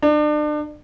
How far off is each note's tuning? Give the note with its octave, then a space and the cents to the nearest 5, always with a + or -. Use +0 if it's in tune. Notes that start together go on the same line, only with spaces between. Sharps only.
D4 +35